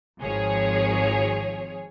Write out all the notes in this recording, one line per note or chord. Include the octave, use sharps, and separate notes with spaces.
G#1 F3 G#4 C#5